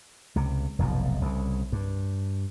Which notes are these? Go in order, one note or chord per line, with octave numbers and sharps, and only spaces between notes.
C#2 C3
F1 B1 F2 G#2
C2 C#3
G2